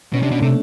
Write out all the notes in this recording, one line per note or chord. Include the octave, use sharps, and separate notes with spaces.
B2 C#4
C3 D4
B2 C#4
C3 A3